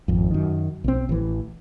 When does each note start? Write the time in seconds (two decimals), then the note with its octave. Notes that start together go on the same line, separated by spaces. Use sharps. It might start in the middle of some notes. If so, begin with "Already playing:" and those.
0.08 G#1 F2
0.31 F#2 D#3
0.84 B1 C4
1.09 A1 E3